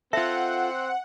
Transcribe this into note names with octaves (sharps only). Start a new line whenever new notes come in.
C4 F4 A4 E5 F#5